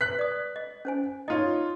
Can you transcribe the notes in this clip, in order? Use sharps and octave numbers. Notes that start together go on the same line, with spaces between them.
B4 F#6 B6
D5 D#6
D#5
C#4 C5 G#5
D#4 F4 C#5 D#5